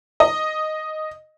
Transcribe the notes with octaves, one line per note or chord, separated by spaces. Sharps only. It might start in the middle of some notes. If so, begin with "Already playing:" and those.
D#5